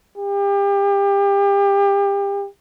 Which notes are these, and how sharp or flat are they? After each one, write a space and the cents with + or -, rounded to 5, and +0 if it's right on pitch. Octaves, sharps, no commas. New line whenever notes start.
G4 +30